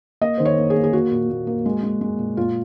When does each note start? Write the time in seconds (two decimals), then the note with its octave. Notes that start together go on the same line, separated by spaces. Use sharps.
0.21 A#3 D#5
0.38 D#3 C5
0.45 C#5
0.58 A#3
0.70 G#4
0.76 A#3
0.84 G#4
0.93 A#3 F#4
1.11 A#2
1.30 A#2
1.47 A#3
1.66 G#3
1.83 G#3
2.01 G#3
2.19 A#2
2.37 A#2 F4